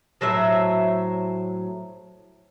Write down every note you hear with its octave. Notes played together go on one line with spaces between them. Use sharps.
A2 F#3 C5 E5